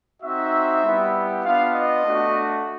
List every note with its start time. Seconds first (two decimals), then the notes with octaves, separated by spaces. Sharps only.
0.22 C4 D#4 F#4 E5
0.84 G3 B3 E4 G4
1.44 B3 D4 F4 F5
1.75 D#5
2.05 A3 D4 F#4